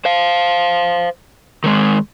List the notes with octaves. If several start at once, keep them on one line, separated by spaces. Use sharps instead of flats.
C5 F5
D#3 G#3